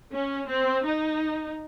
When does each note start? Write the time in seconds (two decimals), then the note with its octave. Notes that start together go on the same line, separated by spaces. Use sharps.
0.13 C#4
0.49 C4
0.85 D#4